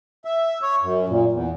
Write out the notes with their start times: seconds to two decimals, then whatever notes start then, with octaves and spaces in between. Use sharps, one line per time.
0.25 E5
0.62 C#5
0.82 F#2
1.09 A#2
1.32 E2